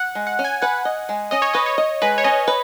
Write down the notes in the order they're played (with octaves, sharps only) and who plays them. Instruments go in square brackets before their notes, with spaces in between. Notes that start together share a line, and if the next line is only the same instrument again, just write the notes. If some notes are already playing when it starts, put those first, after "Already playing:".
Already playing: [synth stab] F#5
[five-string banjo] G#3
[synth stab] F#5
[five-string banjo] C#4
[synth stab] G#5
[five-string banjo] B4 [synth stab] F#5
[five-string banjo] D#5
G#3
[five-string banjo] C#4 [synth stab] D#5
[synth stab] C#5
[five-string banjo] B4 [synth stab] D#5
[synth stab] C#5
[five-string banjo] D#5
[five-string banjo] G#3 [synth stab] B4
[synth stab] C#5
[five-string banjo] C#4 [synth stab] D#5
[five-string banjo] B4